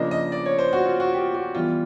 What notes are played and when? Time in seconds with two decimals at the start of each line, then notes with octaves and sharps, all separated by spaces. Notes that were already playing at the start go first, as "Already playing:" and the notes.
Already playing: C#3 F3 A#3 D4 D#5
0.11 D#5
0.32 D5
0.46 C#5
0.59 C5
0.73 F#4
0.86 F4
1.00 F#4
1.14 G4
1.34 F#4
1.55 E3 G3 B3 F4